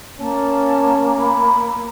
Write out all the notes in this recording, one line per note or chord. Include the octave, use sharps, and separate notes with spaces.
A#3 C#4 A5
B5